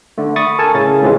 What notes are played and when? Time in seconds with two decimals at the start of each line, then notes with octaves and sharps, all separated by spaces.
0.18 D3 A3
0.36 B5 C#6 D#6 A6
0.59 A4 A#4 G#5 A5
0.74 A2 C#3 C#4 A6
1.02 A2 C3 E3 F3 G#3